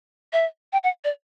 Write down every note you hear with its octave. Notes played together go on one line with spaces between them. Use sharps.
E5
G5
F#5
D5